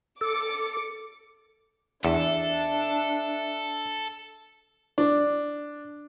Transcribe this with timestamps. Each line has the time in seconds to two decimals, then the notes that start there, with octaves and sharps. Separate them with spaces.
0.21 A4 D6 C#7
2.05 E2 D4 A4 E5
4.98 D4